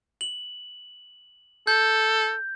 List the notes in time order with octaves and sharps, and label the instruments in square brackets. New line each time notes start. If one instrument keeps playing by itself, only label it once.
[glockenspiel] F#7
[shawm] A4 [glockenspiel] G6